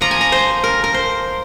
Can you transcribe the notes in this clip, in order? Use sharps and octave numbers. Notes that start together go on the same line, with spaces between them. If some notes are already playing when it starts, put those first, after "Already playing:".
F3 A#3 F4 A#5
G#5
A#5
C5
A#4
A#4
C5